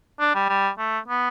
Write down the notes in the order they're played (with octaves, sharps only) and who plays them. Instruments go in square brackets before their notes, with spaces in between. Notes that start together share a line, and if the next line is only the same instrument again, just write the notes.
[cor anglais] D4
G3
G3
A3
B3